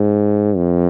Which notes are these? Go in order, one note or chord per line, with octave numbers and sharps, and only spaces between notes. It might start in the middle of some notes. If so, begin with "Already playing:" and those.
Already playing: G#2
F2